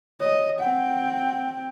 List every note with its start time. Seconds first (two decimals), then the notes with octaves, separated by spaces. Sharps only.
0.20 C#5 D#5
0.60 C4 F#5 G5